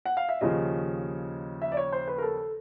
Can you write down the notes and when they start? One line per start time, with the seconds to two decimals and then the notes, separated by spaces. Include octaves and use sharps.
0.05 F#5
0.17 F5
0.29 E5
0.41 D#2 C#3 F3 D#5
1.62 E5
1.72 D5
1.77 C#5
1.92 C5
2.08 B4
2.18 A#4
2.22 A4